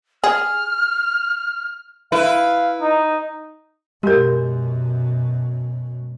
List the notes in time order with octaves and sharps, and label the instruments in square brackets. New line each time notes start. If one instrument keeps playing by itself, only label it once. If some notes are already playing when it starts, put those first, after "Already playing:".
[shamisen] G#4 [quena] F6
[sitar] E4 B4 [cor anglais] F5
[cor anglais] D#4
[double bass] F#2 B2 [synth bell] G#3 [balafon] G4 A#4